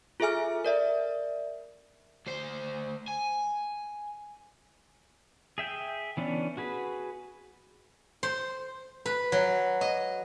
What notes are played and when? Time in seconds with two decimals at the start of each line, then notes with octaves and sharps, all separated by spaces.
0.20 F4 G#4 A4 E5 G#5 F6
0.65 A#4 D5 E5
2.27 D2 C5
3.08 G#5
5.58 G#4 E5 G5
6.17 E3 B3 C#4 D4
6.57 F#4 G#4 B4
8.23 C5
9.06 B4
9.32 F#3
9.81 D#5